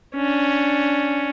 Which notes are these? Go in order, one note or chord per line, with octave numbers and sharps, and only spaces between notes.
C#4 D4